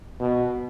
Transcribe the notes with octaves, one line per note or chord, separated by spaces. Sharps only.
B2